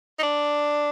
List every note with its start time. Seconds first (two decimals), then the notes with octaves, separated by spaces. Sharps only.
0.19 D#4
0.23 D4